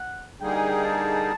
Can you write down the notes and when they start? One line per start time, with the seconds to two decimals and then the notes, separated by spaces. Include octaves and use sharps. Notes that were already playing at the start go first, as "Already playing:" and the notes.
Already playing: F#5
0.40 D3 G3 A#3 D#4 G#4 G5
0.55 G#5
0.69 G5
0.84 A5